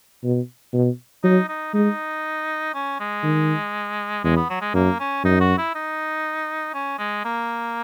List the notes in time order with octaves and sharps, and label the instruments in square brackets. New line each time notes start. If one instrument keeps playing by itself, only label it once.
[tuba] B2
B2
[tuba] F#3 [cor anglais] D#4
[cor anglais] D#4
[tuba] G#3 [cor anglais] D#4
[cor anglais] C#4
G#3
[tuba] D#3
[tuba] E2 [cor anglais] G#3
[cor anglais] B3
F#3
G#3
[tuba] F#2 [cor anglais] A#3
[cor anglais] C#4
[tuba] F#2 [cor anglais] D#4
[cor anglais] F#4
E4
D#4
C#4
G#3
A#3